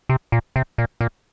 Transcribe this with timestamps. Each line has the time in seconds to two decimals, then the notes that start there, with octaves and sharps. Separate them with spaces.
0.09 C3
0.32 A#2
0.56 C3
0.78 A#2
1.01 A#2